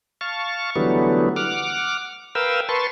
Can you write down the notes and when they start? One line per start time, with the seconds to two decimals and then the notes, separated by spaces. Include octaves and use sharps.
0.21 F5 A5 C#6
0.76 D3 E3 F#3 G3 A3 B3
1.36 F#5 D6 F6
2.35 A#4 B4 F5 G5 E6
2.69 B4 A5 C6 C#6